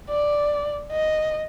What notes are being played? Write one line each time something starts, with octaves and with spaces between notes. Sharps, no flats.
D5
D#5